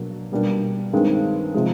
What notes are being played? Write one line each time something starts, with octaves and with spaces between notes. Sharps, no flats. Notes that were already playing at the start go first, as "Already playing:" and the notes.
Already playing: B2 F#3 A#3 D4
B2 G3 A#3 D4
G2 D#3 G#3 C4
C3 F3 G#3